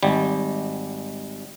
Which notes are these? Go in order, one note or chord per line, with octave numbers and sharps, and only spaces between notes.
G#1 G3